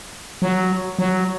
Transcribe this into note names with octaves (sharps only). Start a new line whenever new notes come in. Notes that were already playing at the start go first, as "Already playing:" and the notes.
F#3
F#3